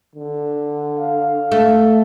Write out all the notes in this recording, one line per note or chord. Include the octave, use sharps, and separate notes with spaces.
D3
F5
A3